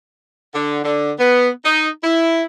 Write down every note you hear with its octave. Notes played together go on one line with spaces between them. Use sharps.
D3
D3
B3
D#4
E4